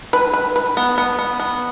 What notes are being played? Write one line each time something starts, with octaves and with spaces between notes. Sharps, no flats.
B4
B4
B4
B3
B3
B3
B3